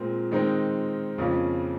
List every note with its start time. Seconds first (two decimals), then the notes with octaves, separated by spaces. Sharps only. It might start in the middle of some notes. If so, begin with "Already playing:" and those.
Already playing: A#2 G#3 C4 A#4
0.31 D#3 G#3 C4 D#4 A#4
1.18 F2 C#3 F3 A#3 C#4